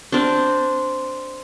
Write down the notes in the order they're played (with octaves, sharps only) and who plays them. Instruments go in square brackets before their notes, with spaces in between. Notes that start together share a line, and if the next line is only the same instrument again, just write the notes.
[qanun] C4 D4